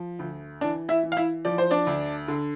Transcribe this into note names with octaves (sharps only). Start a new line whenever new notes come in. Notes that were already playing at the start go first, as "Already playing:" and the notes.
Already playing: F3
D2
E3 D4 D5
E4 E5
E3
F5
E4 E5
F3 D5
C5
D4 D5
D2
D3